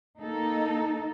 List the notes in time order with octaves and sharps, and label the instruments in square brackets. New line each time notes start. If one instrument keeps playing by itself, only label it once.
[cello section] A#3 D#4 A4